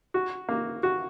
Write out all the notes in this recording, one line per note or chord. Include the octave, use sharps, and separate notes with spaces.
F#4
A#3
F#4